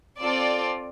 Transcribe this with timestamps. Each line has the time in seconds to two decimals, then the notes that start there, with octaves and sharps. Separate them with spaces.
0.20 C4 F4 A4 D5